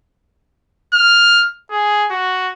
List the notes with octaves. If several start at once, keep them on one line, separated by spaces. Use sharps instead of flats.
F6
G#4
F#4